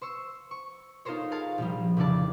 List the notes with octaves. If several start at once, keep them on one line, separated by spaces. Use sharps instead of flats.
C5 C#6 E6
C#6
D#4 F4 A4 A#4 C5 C#5
G#4 A#4 F5 A5
A#1 F3 G3
F1 C#3 E3 D5 A5